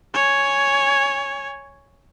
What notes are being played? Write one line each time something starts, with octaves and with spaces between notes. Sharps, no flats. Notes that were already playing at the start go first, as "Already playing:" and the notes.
C#5 G#5